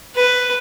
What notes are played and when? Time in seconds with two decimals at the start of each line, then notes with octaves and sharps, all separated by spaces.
0.16 B4